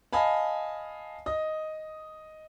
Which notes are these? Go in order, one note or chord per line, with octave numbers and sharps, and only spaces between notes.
D#5 F5 G#5 A5 B5
D#5 D#6